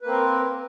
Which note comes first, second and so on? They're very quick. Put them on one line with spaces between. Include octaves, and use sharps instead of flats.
B4 A#3 C4 A#4